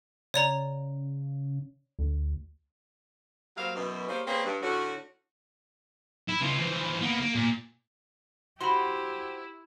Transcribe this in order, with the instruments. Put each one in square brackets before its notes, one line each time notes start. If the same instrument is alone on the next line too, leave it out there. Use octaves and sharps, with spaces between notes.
[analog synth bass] C#3 [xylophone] C#5 D5 A#5
[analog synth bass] D2
[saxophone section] F#3 G3 A#3 C4 F5
F#2 B2 E3
G3 A#3 C#4 G4 G#4 C5
A#3 C4 C#4 G#4 B4 C5
G2
A2 D3 C#4 F#4
[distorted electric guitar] E4
C#3 F4
E3 F3
A#3 B3
A#3
A#2
[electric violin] E4 [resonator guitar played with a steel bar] F#4 C5 [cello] G4 [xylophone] B5 C6